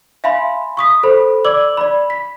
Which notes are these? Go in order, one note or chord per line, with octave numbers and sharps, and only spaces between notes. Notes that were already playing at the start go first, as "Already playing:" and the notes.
E5 F5 G#5 B5 C6
C#6 D#6 B6
A4 C5 B5
D5 D6 E6 F#7
D5 B5
B6